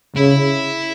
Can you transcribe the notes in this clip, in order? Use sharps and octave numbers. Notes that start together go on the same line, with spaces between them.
C#3 E4